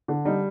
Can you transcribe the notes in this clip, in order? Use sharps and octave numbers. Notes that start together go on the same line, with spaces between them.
D3
G3 D#4